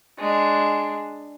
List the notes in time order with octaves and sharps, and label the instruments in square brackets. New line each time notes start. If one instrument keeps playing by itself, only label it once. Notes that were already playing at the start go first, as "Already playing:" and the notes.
[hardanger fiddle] G#3 D4